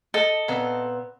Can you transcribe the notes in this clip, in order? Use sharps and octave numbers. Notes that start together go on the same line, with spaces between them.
A4 D#5
A#2 B3 C4